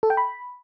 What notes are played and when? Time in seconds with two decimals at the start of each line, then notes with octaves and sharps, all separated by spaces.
0.03 A4
0.10 G5
0.17 B5